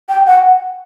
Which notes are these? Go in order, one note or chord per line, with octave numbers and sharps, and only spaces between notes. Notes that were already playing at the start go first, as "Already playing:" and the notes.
G5
F#5